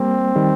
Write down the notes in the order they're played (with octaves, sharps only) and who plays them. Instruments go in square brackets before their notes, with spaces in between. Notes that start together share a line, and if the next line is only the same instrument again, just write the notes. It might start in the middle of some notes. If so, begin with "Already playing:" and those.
Already playing: [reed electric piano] G3 A#3 [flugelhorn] C4
[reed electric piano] D#3 G3